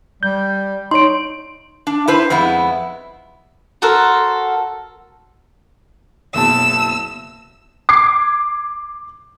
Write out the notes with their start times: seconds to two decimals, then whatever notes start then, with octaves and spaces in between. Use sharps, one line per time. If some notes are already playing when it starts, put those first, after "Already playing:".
0.23 G3 G6
0.91 D#4 C#5 C6 D7
1.87 D4
2.08 E4 B4 C5
2.30 F2 G#3 B3 E4
3.82 F#4 A4 A#4 C5
6.34 F#1 B2 A5 E6
7.89 D6 G#6 C7